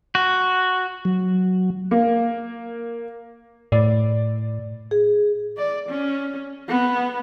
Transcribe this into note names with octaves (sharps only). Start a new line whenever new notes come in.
F#4
F#3
A#3
A2 D5
G#4
D5
C#4
B3